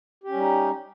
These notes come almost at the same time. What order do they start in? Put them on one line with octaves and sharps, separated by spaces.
G4 C#4 G3 D#4